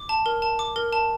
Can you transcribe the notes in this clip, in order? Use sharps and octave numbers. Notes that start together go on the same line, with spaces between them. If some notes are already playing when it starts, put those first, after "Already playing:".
Already playing: D6
A5
A#4
A5
D6
A#4
A5